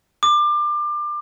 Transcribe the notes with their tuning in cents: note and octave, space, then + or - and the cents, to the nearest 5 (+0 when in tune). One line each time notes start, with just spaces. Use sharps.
D6 +25